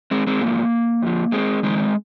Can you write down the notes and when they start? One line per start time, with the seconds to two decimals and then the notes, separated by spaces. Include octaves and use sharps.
0.11 G#3 C4
0.27 G#3 C4
0.41 G#2 F3 A#3
1.02 F2 F3
1.32 G#3 C4
1.63 F2 D#3 G#3 C4